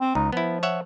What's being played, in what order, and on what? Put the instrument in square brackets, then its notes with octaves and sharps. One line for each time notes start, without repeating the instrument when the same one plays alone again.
[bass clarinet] C4
[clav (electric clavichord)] C#2 [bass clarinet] D#4
[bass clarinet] F3 [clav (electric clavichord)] B3 E4
[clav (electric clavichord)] C#5 E5 F#5